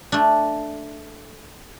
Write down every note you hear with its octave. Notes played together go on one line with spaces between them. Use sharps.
A3 D4